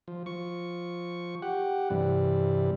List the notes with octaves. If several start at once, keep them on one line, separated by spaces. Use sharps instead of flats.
F3
F3 C#6
G4 F#5
G2 C3 E3 G3